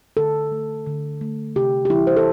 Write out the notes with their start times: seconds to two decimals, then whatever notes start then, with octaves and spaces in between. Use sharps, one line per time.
0.17 D3 A4
0.52 A3
0.86 D3
1.21 A3
1.56 C3 G4
1.85 G4
1.90 E3 G3 E4
2.07 C5
2.17 A4